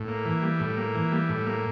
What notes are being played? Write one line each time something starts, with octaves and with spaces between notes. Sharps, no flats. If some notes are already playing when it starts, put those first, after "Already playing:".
Already playing: A2
A#3
E3
G3
A2
A#3
E3
G3
A2
A#3